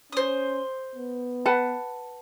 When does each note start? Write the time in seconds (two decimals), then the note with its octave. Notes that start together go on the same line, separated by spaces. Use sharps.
0.12 C#4 C5 D#6
0.95 B3
1.46 B4 F#5 A5